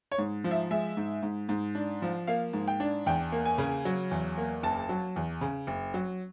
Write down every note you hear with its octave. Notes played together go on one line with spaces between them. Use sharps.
C#5
G#2
F3
E5
G#3 E5
G#2
G#2
G#2
D4
F3
A#3 F5
G#2
G5
D4
E2 G5
A#3
G#5
C#3
F#3
E2
A#3
F#1 A5
F#3
E2
C#3
F#1
F#3